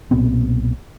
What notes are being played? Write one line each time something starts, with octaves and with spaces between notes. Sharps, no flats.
B1 A#2 B3 C4